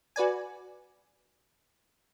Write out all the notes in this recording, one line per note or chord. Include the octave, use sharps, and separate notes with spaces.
F#4 B4 D5 G#5